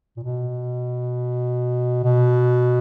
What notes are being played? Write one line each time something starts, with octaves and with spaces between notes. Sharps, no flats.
A#2
B2
B2